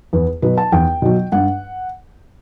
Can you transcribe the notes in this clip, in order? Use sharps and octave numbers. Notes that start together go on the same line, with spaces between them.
E2 B4
B2 F#3 B4
A5
E2 G5
B2 F#3
G2 F#5